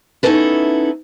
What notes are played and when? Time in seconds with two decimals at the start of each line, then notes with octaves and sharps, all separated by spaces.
0.23 B3 C#4 D#4 E4 A4 B4